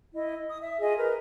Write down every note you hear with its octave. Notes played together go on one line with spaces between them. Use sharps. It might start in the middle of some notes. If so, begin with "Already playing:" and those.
E4 D#5
D#6
E5
F4 G#4 D#5
A#4 B4